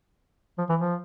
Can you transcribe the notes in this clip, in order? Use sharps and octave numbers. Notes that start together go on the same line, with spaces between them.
F3
E3
F3